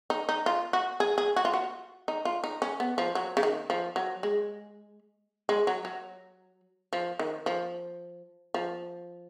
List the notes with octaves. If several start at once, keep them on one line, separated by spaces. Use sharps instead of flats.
D#4
D#4
F4
F#4
G#4
G#4
F#4
F4
F#4
D#4
F4
D#4
C#4
B3
F3
F#3
C#3
D#3
F3
F#3
G#3
G#3
F#3
F#3
F3
D#3
F3
F3